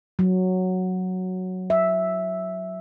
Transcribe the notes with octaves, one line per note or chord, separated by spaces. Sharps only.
F#3
E5